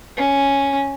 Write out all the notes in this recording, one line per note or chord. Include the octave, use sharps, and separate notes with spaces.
C#4